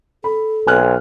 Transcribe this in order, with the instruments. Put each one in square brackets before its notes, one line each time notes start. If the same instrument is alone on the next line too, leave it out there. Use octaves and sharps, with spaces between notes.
[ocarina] A4 [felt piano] B5
[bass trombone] B1 [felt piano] G#5 F6 F#6